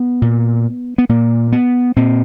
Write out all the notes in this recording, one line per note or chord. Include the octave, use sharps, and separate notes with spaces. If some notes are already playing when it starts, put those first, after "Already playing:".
Already playing: B3
A#2
B3
A#2 A#3
B3
A#2 C4